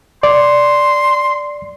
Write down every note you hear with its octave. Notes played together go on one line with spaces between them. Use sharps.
D5 C6